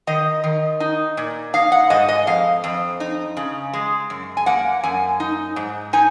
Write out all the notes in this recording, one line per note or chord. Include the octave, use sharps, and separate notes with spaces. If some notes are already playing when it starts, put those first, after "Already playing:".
D#3 D#5
D#3
D#4
A#2
D#4 F5
F#5
G#2 D#5
D#5
F2 F5
F2
D#4
C#3
G#3
F#2
G#5
A#3 F#5
F#2 G#5
D#4
G#2
D#4 G#5